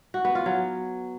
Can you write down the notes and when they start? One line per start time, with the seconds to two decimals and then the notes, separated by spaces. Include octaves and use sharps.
0.14 F#4
0.25 B3
0.35 F4
0.46 F#3